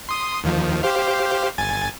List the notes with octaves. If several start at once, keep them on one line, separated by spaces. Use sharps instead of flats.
C6 D#6
D#2 D#3 F3
G4 C5 F5
G1 G#5 A6